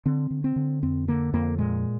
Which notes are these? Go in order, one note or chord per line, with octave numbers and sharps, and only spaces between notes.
D3 C4
D3
C4
D3
F2 C4
D3 A#3
F2 A#3
A#2 G#3